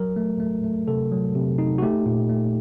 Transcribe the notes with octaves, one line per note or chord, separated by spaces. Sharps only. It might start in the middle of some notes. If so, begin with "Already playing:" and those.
Already playing: F#3 A#4
A3
A3
A3
C3 A4
F#3
C3
D#4
F#4
A3 G4
A#2
A3